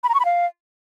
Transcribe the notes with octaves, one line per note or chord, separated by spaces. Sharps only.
B5
A#5
C#6
B5
F5